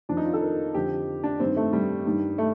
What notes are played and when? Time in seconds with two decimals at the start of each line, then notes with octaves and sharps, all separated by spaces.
0.09 F2 D#3 D4
0.17 D#4
0.25 F4
0.33 A4
0.42 A#4
0.74 F2 D3 G4
1.24 D4
1.40 G2 D#3 C4
1.56 A3
1.73 G3
2.06 G2 D#3
2.38 A3